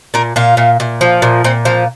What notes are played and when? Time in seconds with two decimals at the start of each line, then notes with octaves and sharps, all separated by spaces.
0.14 A#2 A#4
0.36 A#2 F4
0.57 A#2
0.80 A#2
1.01 F3
1.22 A#2
1.44 A#2 C4
1.65 F3 C4